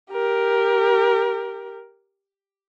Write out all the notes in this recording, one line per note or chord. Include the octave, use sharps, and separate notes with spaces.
G4 A#4